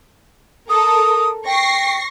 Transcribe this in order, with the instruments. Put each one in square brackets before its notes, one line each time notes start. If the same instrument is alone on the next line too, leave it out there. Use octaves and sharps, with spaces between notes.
[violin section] A4 A#4 [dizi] D#6
[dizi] G5 [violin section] C#6 A#6 C7